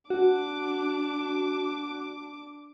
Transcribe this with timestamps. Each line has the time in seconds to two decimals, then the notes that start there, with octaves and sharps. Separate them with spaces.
0.10 D4 F#4 D6